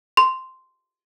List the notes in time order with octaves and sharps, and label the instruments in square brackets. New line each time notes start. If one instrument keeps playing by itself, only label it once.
[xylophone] C6